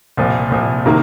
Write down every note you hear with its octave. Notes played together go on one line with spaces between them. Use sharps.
C2 A#2 F3
C2 A#2 F3
C3 D#3 A#3